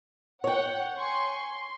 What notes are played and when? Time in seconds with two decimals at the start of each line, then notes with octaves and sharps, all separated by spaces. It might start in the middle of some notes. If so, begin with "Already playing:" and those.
0.44 C#5 F#5 G5
0.97 G#5 C6 C#6
1.40 C6